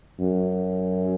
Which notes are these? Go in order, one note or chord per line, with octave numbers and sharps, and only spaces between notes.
F#2